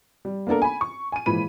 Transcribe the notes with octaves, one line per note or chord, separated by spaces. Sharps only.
G3
A#3 B3 D4 A4 A#4
G#5 B5
C#6
G#5 D#7
A#2 E3 F3 G#3 B5 D#7